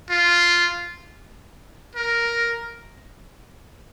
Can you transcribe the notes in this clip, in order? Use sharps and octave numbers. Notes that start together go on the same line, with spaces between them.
F4
A#4